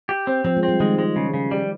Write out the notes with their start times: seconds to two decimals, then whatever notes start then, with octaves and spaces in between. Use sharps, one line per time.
0.09 G4
0.27 C4
0.45 F3 C4
0.57 G#3
0.63 C4
0.68 G3
0.80 D#3 G#3
0.98 G#3
1.16 C#3
1.34 C#3
1.51 G3